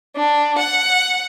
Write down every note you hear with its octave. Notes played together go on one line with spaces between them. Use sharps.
D4
F#5